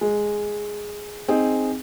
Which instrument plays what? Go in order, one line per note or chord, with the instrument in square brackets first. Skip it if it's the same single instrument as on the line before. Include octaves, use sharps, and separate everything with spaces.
[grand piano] G#3
[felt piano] C4 D#4 G#4